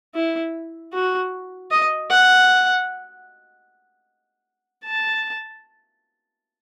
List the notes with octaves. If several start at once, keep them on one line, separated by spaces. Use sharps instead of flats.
E4
F#4
D#5
F#5
A5